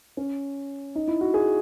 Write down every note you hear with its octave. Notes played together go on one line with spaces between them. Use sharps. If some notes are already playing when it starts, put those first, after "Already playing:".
C#4
D#4
E4
F#4
G#4